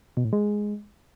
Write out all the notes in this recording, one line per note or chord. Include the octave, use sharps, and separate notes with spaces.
B2
A2
G#3